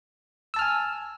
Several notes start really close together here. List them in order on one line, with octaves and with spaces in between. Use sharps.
E6 A5 F6 G#5